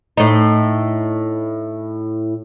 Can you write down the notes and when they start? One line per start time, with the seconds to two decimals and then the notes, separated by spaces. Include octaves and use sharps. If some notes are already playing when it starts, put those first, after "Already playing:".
0.17 A2 D#4